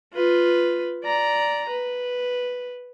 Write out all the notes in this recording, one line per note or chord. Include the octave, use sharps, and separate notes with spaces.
F4 B4
D5 A#5
B4